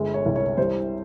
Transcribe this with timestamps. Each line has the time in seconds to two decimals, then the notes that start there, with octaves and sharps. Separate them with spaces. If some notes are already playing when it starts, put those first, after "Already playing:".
Already playing: G1 G#3
0.14 C#5
0.26 C2
0.36 C#5
0.57 G3 C5